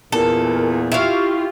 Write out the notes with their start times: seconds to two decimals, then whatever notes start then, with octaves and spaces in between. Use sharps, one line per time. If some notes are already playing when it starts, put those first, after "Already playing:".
0.12 E2 A#2 A4 A#4
0.92 E4 F4 G4 F5 C#6